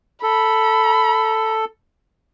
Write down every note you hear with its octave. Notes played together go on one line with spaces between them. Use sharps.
A4 B5